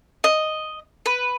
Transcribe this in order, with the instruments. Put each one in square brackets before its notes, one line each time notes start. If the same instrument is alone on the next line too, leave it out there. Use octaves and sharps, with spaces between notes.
[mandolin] D#5
B4